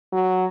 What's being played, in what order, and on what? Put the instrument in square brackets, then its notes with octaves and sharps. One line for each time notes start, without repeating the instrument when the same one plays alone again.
[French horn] F#3